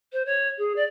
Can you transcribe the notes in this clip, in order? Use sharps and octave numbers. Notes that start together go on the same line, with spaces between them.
C5
C#5
G#4
D5